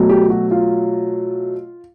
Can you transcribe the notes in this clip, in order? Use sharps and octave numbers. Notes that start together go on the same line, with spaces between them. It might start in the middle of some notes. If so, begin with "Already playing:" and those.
Already playing: B2 F#3 A3
G4
F#4
F4